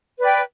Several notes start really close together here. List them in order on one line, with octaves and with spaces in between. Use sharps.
B4 D5 G5